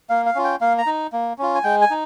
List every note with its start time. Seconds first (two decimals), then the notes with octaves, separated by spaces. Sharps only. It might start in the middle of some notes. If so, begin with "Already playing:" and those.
0.10 A#3 F5
0.26 F5
0.35 C#4 F4
0.44 G5
0.61 A#3 F5
0.78 A#5
0.86 D#4
1.12 A#3
1.38 C#4 F4
1.55 G#5
1.64 G#3 G5
1.81 G#5
1.91 D#4